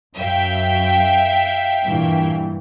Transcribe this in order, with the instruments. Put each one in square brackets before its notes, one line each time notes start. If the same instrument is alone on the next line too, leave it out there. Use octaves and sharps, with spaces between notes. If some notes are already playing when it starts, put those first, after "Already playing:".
[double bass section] F#2 [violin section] E5 F5 G5
[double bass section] G2 A#2 E3